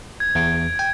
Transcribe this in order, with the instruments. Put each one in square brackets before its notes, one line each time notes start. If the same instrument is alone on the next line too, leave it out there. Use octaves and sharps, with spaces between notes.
[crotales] G#6
[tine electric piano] E2 [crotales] G#6 D7
[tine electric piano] G5